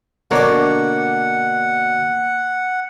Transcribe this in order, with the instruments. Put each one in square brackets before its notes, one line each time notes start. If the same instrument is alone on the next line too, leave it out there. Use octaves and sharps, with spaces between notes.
[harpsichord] B2 D3 D6 [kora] A#3 D4 C#5 [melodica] F#5